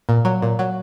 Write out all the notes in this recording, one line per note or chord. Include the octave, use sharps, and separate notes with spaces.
A#2
F#3
A#2
F#3